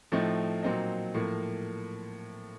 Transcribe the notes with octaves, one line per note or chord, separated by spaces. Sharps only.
A2 F3 A3 C4 D#4
A#2 F#3 C4 D#4
A2 F3 A#3